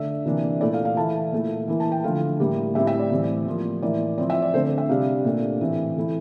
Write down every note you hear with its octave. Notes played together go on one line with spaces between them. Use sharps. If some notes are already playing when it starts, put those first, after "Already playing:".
Already playing: D3 A3 D4 E5
C3 E3 A#3 D4
A#2 A3 E4 D5
F5
F5
E3 A3 E4 A5
A#2 A3 E4
E3 A#3 E4
A5
G5
D3 F3 A3 E4 F5
A2 G3 A#3
A2 G3 C4 E4 E5
E5
D5
A2 E3 G3 C4
A2 F3 A#3
A2 E3 A#3 E4 D5
F3 C4 E4 D5
E5
D5
D3 A3 C4 C5
E5
C3 G3 D4 F5
A#2 A3 D4
A2 E3 A3 C4
E3 A3 E4